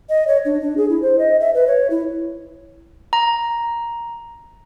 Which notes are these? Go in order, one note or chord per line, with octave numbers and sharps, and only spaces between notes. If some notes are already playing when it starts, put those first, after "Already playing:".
D#5
C#5
D4
D4
G#4
E4
C5
D#5
E5
B4
C#5
E4
A#5